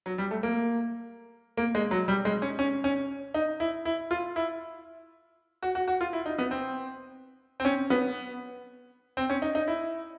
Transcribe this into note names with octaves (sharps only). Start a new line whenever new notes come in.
F#3
G3
A3
A#3
A#3
G#3
F#3
G3
G#3
C#4
C#4
C#4
D#4
E4
E4
F4
E4
F#4
F#4
F#4
F4
E4
D#4
B3
C4
C4
C#4
B3
C4
C#4
D#4
D#4
E4